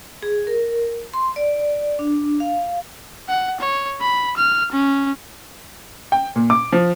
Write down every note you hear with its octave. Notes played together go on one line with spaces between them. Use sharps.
G#4
A#4
C6
D5
D4
F5
F#5
C#5
B5
F6
C#4
G5
A#2
D6
F3